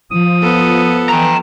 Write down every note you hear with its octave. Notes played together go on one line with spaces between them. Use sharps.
F3 D#6
B3 A4
E3 G5 A#5